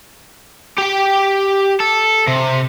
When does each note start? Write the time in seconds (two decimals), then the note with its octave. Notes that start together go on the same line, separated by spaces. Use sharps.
0.78 G4 G5
1.80 A4
2.28 C3